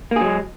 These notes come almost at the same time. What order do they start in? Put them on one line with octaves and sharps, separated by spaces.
A#3 G#4 F#3 G#3